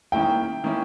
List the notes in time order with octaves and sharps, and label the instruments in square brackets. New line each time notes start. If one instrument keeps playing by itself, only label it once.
[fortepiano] D#3 A#3 C#4 E4 [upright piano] G5
[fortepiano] D#3 A#3 C#4 E4